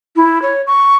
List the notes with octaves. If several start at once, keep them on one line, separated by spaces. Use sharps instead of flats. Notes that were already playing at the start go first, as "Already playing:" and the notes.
E4
C#5
C#6